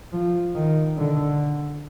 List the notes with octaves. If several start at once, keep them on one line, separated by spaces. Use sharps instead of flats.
F3
D#3
D3